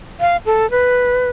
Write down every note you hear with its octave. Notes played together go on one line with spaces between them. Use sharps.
F5
A4
B4